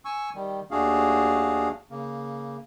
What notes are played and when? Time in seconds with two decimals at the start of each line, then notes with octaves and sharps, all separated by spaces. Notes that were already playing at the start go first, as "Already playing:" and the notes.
0.05 G#5 C#6 E6
0.35 D#3 G3
0.71 D#2 A3 D4 F#4 G#4 F5
1.90 C#3 A#3